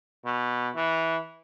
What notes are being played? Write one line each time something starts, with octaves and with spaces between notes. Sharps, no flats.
B2
E3